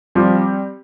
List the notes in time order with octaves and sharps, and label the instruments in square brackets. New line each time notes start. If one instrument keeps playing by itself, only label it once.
[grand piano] F3 [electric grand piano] G3 C4 G4